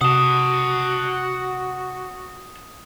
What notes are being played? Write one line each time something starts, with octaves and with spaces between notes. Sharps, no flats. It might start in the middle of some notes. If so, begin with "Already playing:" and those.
C3 F#4 F#5 A5 D#6